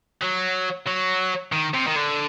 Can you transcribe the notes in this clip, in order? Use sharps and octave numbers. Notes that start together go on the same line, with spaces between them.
F#3
F#3
D#3
C3
D#3
D3